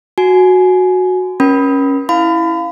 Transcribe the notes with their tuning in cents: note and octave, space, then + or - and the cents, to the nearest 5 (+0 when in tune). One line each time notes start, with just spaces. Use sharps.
F#4 -10 G#5 +20
C#4 -10 A#4 +35 B5 +0
E4 +0 F5 +0 B5 +35